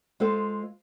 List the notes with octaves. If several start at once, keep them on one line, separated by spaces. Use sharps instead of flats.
G#3 F4 A4 C5 F5